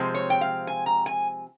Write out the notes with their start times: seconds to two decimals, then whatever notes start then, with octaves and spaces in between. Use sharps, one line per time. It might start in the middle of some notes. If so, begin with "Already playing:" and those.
Already playing: C3 F3 G#3 C4
0.14 C#5
0.30 G5
0.41 F5
0.67 G#5
0.86 A#5
1.06 G#5